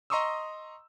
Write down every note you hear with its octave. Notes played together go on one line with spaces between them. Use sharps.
D#5 A#5 C6 C#6 D#6 E6